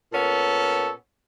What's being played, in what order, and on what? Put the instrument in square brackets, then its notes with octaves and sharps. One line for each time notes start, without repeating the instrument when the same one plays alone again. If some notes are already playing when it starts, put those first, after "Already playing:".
[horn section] A#2 B3 C#4 A4